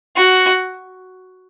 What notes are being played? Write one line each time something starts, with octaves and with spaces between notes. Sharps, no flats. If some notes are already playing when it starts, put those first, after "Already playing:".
F#4